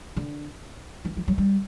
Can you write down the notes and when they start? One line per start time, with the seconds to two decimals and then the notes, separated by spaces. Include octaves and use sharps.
0.16 D3
1.05 E3
1.17 F3
1.28 F#3
1.38 G3